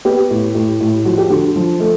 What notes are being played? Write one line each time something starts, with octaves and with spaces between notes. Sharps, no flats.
B3 G4
A2
A2
A2
F3 F#4
G4
D3 F#4
F3
A3